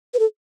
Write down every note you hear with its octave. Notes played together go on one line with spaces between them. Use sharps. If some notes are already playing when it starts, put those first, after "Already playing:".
B4
A4